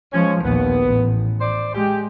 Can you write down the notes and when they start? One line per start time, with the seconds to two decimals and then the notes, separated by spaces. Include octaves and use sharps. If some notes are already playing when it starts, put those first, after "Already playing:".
0.13 F3 G#3 C#4
0.44 A#1 D#2 B3
0.83 A1
1.41 C5 D5
1.74 G#3 G4